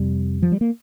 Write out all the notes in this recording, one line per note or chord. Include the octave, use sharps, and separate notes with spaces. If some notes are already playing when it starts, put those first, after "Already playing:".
Already playing: F2 C3 G3
F3
G3
A#3